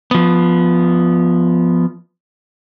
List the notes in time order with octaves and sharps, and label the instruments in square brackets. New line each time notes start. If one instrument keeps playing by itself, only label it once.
[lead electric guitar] F3 B3